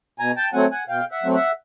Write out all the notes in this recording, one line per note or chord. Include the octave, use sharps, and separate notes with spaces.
B2 G#5 A#5
G5 A5
F#3 A3 C4 F#5 G#5
F#5 G#5
B2 F5 G5
E5 F#5
F#3 A3 C4
E5 F#5